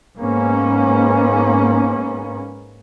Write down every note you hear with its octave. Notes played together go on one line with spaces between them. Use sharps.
G#2 A#3 B3 C#4